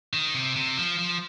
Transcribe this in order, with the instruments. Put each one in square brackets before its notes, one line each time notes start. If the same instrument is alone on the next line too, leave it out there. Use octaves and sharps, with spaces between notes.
[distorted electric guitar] D#3
C3
C3
F3
F3